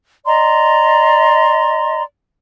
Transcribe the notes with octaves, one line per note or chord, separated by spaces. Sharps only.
D5 D#5 A#5 C6